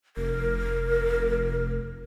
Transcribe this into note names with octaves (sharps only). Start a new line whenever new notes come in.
F1 A#4